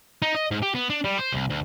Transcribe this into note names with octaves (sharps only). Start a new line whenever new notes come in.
D#4
D#5
G#2
G4
B3
D4
G3
C5
C2
D2